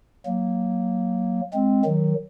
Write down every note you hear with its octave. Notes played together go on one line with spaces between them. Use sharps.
F#3 A#3
G#3 C4
D#3 F#3